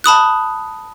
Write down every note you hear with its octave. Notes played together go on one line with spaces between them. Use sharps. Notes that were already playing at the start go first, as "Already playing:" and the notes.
A5 B5 D#6 F#6